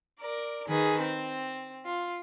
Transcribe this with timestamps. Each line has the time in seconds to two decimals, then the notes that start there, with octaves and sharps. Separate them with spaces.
0.21 A#4 D5
0.68 D#3 G#4 B4
1.01 C4
1.86 F4